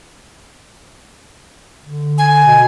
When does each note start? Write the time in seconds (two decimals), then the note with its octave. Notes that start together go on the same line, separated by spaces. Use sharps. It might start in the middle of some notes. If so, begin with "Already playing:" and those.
1.85 D3
2.18 G#5
2.44 B2